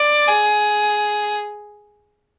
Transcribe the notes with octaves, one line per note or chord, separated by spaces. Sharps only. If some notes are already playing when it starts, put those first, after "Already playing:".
Already playing: D5
G#4